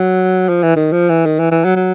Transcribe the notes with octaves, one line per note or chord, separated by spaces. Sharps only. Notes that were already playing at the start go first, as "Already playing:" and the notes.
Already playing: F#3
F3
E3
D#3
F3
E3
D#3
E3
E3
F#3
F#3